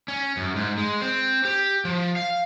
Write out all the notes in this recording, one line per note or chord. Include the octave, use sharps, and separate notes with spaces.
C#4
F#2
G#2
G#3
C4
G4
F3
F5